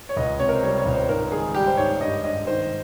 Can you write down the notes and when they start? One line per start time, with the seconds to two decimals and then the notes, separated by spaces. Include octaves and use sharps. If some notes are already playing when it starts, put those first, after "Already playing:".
0.09 C#5
0.17 C#2 D#5
0.39 C3 C#5
0.49 A#4
0.55 C5
0.63 G3 C#5
0.78 C#5
0.86 C#2
0.93 C5
1.08 G#2 A#4
1.31 D#3 G#4
1.54 G3 G4
1.67 C5
1.77 G#2 C#5
2.01 G2 D#5
2.24 G2 D#5
2.47 D#3 C5